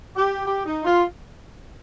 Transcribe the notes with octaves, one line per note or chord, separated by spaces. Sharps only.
G4
G4
D#4
F4